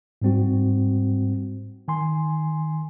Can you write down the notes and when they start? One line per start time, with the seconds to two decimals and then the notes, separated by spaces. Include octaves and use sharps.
0.22 G#2 G3 C4 F#4
1.88 D#3 G#5 C6